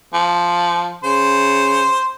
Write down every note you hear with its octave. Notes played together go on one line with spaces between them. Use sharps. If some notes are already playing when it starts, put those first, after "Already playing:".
F3
C#3 C5